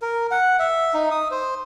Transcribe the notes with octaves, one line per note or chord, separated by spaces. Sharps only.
A#4
F#5
E5
D#4
D#6
C5